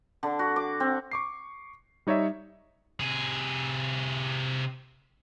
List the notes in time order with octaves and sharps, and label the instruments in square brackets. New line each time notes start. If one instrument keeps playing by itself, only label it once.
[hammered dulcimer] D3
F#4
D6
C4
[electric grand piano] C#6 D6 C7
G3 D#4 C#5 D5 E5
[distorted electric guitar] C3 G#4